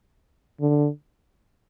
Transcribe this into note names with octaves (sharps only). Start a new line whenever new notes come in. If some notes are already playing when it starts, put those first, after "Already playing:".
D3